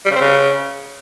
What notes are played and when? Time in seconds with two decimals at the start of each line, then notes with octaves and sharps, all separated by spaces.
0.05 G3
0.10 C#3
0.16 C4
0.21 C#3